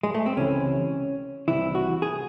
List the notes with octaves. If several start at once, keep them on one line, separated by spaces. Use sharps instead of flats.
G#3
A3
C4
C#2 C3 E3 C#4
C2 C3 E3 E4
F#4
G#4